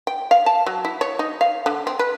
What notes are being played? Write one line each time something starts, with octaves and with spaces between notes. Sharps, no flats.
G5
F5
A5
F#3
E4
C#5
D#4
F5
D3
C4
B4